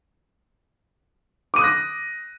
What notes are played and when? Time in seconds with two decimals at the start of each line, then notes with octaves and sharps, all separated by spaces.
1.54 D6
1.56 D#7
1.59 D#6
1.61 F#6
1.64 A#6